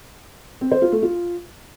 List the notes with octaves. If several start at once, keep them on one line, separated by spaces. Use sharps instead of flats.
C4
C5
F4
A3
F4